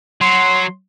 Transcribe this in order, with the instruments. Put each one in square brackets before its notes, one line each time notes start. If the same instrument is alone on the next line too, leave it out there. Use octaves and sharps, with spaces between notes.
[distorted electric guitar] F#3 [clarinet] C6